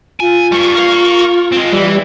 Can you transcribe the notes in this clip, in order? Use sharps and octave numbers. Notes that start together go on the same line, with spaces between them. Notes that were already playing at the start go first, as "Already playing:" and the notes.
F4 G#5
G2 G3 C#6
A#4 F5
G#3 C4
E3 G3